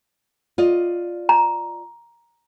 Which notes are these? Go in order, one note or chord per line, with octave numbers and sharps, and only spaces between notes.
F4 D5 D#5
A#5